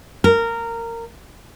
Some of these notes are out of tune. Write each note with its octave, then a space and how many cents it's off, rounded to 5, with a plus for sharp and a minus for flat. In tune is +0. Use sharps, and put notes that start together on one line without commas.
A#4 -15